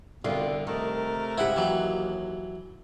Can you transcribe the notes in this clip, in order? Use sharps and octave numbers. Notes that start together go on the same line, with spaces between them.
C2 B2 D3 G3 F4
C3 D#3 A3 A#4
G#2 C#3 G3 E4 G4 C5 F#5
D#2 E3 F#3